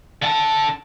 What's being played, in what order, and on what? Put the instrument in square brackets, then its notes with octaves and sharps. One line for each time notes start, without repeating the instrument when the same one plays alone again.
[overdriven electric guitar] D3 A5